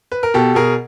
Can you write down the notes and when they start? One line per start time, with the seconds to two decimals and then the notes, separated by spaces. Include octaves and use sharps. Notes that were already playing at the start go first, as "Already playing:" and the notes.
0.12 B4
0.23 A#4
0.34 B2 G4 A4
0.55 B2 G#4 A#4